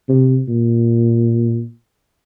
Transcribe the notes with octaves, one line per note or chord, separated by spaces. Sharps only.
C3
A#2